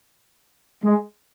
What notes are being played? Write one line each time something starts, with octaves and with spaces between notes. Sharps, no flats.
G#3